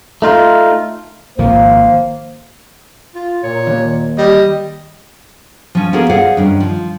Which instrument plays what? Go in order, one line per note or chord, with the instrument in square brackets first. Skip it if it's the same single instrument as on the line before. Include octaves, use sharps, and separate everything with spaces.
[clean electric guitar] A3 D#4 F4
[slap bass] G#1 D#3 F3 [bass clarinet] A#3 [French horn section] C5
[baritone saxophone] F4
[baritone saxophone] A#2 [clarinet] C#5
[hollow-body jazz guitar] D#2
[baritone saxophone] G3 [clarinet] D#5
[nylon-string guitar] F3 C#4
A#3 B3 F#4 G#4 A#4
G#4 C5 D5 F5 F#5
G2 D#3 C#4
F3